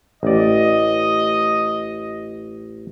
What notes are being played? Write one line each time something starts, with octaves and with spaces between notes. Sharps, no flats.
A1 D5 D#5